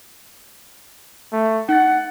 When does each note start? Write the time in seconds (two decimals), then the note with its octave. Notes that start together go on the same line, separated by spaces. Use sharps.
1.33 A3
1.69 D#4 F#5 A6